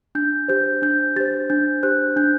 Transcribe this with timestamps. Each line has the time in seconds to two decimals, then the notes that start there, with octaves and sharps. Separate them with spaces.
0.15 D4 G6
0.48 G4 C5 G6
0.82 D4 G6
1.16 G4 C5 A6
1.50 D4 G6
1.83 G4 C5 F#6
2.16 D4 G6